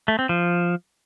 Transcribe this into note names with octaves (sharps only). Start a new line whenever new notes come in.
A3
C4
F3